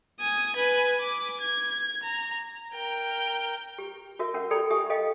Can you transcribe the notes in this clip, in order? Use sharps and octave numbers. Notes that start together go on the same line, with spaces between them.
G#5 D#6
B4 G#5
D6
G#6
A#5
A#4 G5
G4
F#4 A#4 E5
C#4 A#4 F#5
G4 A4 D5 G5 A#5 B5
G4 E5 G#5 C#6 D#6
A4 D#5 F5 G5